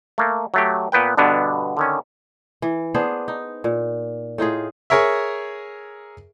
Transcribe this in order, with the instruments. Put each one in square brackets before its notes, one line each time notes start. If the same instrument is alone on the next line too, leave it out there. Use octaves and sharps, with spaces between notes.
[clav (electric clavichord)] A3 A#3
F#3 A3 G4
A#2 B3 B4 G5
G2 B2 D3 B3 D4
D3 D#3 C#4
[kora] E3
B3 D4 G#4 C5
D#4
A#2
A2 D#4 F4 G#4
[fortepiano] G#4 A#4 C#5 E5